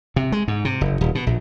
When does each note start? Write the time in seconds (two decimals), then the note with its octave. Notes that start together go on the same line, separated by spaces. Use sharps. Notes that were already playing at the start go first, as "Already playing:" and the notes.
0.16 C3
0.32 G#3
0.48 G#2
0.65 C3
0.81 F#1
1.01 D#1
1.15 B2
1.27 A#1